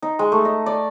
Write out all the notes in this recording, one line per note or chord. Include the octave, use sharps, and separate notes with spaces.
D#4
G#3
A3
D#5
D5